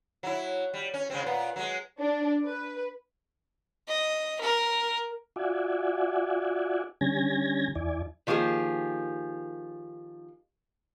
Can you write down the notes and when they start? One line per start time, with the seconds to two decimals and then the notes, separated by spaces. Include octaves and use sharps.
0.23 F#3 E4
0.74 G3
0.94 C#4
1.10 C#3 G#3 C4
1.23 A#2 B3
1.56 F#3 G#3
2.00 D4
2.47 B4
3.88 D#5
4.41 A#4
5.36 F4 F#4 D5 E5 F#5 G#5
7.01 D3 G3 C#4 G#5 G#6 A#6
7.75 E2 E4 D5 G#5
8.27 D#3 F3 A#3 G4 G#4